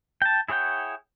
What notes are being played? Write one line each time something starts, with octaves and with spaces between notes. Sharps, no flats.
G5 A5
E4 G#4 C#5 F#5 G5